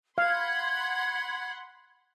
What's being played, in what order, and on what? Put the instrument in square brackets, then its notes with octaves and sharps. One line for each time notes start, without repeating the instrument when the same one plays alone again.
[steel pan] F5 [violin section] F#5 B5 C6 [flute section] G#6